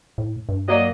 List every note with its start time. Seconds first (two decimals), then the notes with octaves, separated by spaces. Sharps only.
0.18 A2
0.49 G2
0.68 F#3 A#3 D5 D#5